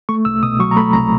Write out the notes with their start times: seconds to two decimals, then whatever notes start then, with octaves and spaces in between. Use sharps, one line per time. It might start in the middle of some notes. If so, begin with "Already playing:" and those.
0.09 A3 C#6
0.25 C2 E6
0.43 B2 D#6
0.60 F#3 C#6
0.71 A#5
0.77 A3 B5
0.93 C2 A#5